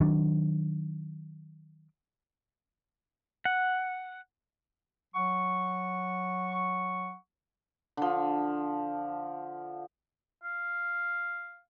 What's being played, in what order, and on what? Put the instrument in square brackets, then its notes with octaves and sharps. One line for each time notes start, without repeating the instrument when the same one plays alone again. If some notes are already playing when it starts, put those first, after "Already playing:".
[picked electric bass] D#3 F#3 D4
[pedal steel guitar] F#5
[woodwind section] F#3 F#5 C#6
[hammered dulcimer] D3 F3
[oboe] F5